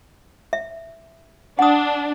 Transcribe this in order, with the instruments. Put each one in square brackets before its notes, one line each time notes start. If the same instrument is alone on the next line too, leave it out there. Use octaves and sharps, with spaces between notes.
[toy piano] E5
[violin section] D4 [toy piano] F#5 D#6